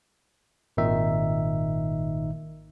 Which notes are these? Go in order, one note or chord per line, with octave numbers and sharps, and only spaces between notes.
G#1 A#2 D#3 D#4 E5